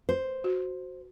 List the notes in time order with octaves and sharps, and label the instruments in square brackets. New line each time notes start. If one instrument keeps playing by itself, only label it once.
[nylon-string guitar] C5
[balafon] F#4